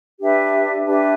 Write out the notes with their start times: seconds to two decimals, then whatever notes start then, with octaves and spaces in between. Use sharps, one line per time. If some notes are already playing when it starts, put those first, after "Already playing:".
0.19 D4 G4 B4 E5
0.85 D4 G4 B4 E5